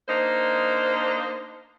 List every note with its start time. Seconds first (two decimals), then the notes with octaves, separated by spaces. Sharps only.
0.09 A#3 D4 D#4 C5